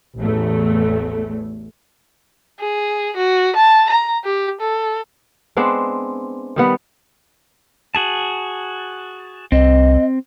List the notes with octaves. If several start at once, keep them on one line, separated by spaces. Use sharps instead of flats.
A1 E2 A3
G#4
F#4
A5
A#5
G4
A4
G#3 B3 C4 D4
D#3 G3 B3
F#4 G#4 A5
C2 C4 D#5